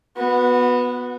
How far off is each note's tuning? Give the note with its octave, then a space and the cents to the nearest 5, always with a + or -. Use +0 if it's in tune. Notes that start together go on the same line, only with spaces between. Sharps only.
B3 +0 F#4 -25